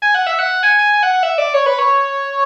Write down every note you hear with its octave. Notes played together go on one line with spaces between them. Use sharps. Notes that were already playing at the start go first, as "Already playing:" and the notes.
G#5
F#5
E5
F#5
G#5
G#5
G#5
F#5
F#5
E5
D5
C#5
B4
C#5